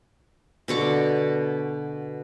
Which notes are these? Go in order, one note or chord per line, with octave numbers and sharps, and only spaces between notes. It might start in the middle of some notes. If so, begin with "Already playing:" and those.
B2 D3 C#6 D6